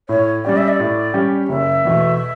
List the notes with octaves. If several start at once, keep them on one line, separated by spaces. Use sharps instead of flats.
A2 C#5
G3 C#4 G4 D5
E5
D5
A2
G3 C#4 G4
F#1 E5
E2 B2 A3